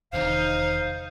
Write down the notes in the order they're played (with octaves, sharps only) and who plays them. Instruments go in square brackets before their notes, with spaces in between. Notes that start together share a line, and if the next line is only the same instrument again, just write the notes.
[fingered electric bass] E1 C3 D#3 [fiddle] D#4 [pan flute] C5 [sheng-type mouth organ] F5